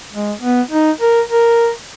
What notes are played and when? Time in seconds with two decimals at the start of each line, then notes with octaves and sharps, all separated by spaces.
0.13 G#3
0.41 B3
0.71 D#4
1.01 A#4
1.29 A#4